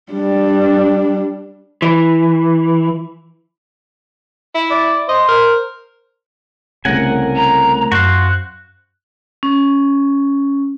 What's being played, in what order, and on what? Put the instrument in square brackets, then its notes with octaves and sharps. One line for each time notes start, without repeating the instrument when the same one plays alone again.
[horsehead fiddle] G3 D4
[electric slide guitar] E3
[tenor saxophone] E4
[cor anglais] D5
[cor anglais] C5 [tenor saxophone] D#5
[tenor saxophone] A#4
[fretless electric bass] C2 C#3 [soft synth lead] A3 [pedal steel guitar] A#4 F#5 G#5
[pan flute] A#5
[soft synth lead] F#2 [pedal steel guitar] F#4 C5 F5 [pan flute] F#6
[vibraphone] C#4